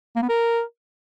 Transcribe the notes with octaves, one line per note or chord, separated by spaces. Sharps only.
A#3
B3
A#4